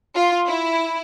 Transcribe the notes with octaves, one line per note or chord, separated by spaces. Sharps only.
F4
E4